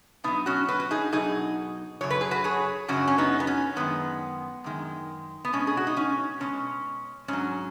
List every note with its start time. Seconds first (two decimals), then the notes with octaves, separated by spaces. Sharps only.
0.24 B2 F#3 B3 D#4
0.46 C#4 F#4
0.68 F#4 B4
0.80 F#4
0.91 D#4 G#4
1.12 B2 F#3 D#4 G#4
2.01 F#2 C#3 F#3 C#5
2.10 B4
2.21 G#4
2.31 F#4 B4
2.44 G#4 C#5
2.88 F#2 C#3 F#3 C#4 F#4
3.07 C#4
3.18 B3 D#4
3.40 B3
3.47 C#4
3.76 F#2 D#3 G#3 B3
4.64 F#2 D#3 G#3
5.45 B3
5.53 B2 G#3 C#4
5.67 G#4
5.77 F#4
5.87 D#4
5.97 C#4
6.40 B2 G#3 C#4
7.28 G#2 F#3 C#4